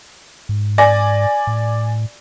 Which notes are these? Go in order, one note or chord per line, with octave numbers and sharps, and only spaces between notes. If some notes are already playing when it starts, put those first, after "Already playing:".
G#2
D5 G#5 A#6
A2